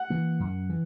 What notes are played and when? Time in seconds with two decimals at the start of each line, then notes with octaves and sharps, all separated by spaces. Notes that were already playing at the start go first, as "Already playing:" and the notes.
Already playing: F#5
0.10 E3 A#3
0.40 F#2
0.69 E3